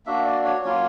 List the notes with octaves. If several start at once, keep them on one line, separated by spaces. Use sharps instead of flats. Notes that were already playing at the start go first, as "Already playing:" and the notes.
A#3 D4 F#4 E5
D5
C#5
F#3 A#3 C#4 F4 C#5